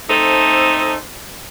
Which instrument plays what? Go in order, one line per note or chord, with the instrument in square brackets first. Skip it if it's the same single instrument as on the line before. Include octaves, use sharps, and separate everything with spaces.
[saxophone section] A3 C4 D#4 A4 C5